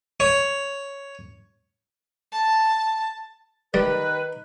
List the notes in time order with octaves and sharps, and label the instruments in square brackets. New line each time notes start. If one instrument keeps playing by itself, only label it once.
[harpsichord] C#5
[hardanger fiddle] A5
[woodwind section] D#3 B4 [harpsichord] G3